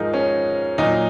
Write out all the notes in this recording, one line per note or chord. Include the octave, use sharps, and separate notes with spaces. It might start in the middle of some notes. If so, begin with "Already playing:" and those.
Already playing: G#2 F3 D#4 G#4 A#4
C#4
A#2 F#3 D#4